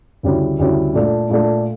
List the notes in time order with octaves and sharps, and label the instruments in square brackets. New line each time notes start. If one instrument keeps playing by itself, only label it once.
[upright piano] D2 C#3 G3 C#4 E4
D2 C#3 G3 C#4 E4
A#2 A3 D4 A4
A#2 A3 D4 A4